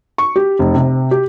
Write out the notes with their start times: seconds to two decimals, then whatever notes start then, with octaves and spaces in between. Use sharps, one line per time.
0.18 C#6
0.36 G4
0.59 F1
0.75 C3
1.11 G4